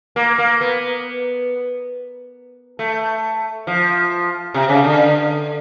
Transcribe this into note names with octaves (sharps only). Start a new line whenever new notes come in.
A#3
A#3
B3
A3
F3
C3
C#3
D3